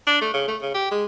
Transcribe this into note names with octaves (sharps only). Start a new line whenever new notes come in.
D4
A3
C#3
A3
C#3
G4
G#3